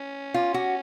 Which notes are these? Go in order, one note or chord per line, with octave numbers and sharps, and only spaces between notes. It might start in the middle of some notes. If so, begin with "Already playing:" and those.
Already playing: C#4
F4
F#4